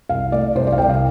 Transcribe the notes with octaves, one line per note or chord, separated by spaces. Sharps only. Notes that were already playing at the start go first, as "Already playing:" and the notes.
C2 F5
A3 D5
C2 C5
D5
F5
C2 G5
D5
F5